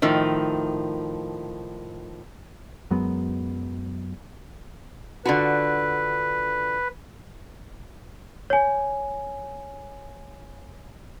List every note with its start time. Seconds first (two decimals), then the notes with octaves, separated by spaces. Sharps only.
0.02 A2 D#3 F3
2.91 F#2 F#3 G#3 B3
5.25 D3 F4 F#4 B4
8.50 C#5 G#5